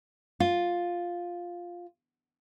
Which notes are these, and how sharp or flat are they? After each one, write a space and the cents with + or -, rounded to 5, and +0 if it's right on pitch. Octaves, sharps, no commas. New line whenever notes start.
F4 +5